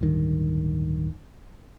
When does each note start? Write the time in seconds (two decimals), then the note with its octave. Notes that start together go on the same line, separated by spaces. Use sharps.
0.01 D1 G2 D#3